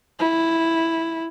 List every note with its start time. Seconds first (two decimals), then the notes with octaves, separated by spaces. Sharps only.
0.19 E4